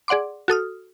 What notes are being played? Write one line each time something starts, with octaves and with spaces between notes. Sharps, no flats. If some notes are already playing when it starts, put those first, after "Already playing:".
G#4 D5 F#5 C6 D6
F#4 A4 D#6 F6